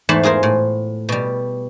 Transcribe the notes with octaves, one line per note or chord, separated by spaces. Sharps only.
E2 G#2 A3 A5 B5 C6
F4 G#4 A#4 C5
A2
B2 G3